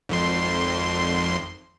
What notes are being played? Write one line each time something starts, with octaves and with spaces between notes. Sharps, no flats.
G#1 F2 C6